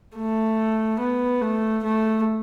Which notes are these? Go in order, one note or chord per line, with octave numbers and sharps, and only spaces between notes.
A3
B3
A3
A3